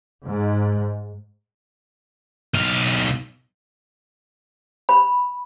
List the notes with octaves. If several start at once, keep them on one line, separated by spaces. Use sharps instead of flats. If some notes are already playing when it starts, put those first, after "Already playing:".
G#2
B1 F5
B5